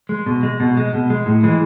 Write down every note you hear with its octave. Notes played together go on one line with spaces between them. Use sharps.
G#3
B2
G#3
B2
G#3
B2
G#3
A2
E3 G#3